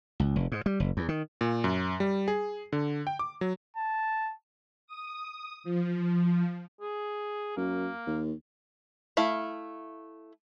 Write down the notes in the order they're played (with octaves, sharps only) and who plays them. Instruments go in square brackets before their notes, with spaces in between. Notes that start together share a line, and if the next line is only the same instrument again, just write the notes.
[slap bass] C#2
F1
G#2
G3
F#1
E2
D#3
[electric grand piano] A#2
F#2
G3
G#4
D3
G5
D6
F#3
[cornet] A5
[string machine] D#6
F3
[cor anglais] G#4
[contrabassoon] F#2 [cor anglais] A#3
[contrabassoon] D#2
[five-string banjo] A3 E4 F5